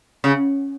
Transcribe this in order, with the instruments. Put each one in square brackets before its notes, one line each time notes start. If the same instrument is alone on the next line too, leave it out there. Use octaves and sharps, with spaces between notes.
[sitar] C#3